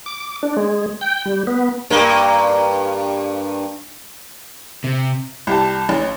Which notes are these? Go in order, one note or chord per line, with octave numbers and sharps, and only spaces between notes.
D6
D4
G#3
G5
G3
B3
G2 A#3
C3
C2 G4 A5
A1